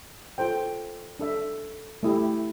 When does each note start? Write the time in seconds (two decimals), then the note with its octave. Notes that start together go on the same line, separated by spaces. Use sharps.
0.38 F4 A4 C5 G5
1.19 D4 A4 E5
2.03 A3 E4 G4